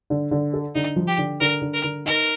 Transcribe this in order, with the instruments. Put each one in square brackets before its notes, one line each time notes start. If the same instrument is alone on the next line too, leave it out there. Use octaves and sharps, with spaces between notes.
[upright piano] D3
D3
A4
[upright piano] D3 [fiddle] D#4
[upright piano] F3
[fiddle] G4
[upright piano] D3
[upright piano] D3 [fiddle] A#4
[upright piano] D3
[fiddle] A#4
[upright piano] D3
[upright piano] D#4 [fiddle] A#4